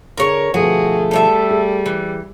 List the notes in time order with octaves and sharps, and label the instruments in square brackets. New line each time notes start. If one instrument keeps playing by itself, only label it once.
[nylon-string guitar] D3 G#4 [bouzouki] A#4 C#5
[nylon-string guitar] B2 D3 F3 [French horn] A3 [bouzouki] F#4 [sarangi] G#4
[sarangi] G3 [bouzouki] A4 C#5 E5
[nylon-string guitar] G#4
[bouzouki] E3